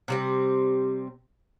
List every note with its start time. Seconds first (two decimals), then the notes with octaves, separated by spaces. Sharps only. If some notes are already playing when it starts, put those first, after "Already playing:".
0.08 C3 G3 C4